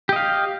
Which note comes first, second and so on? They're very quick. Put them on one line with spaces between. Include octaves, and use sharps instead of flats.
G4 D#5 F5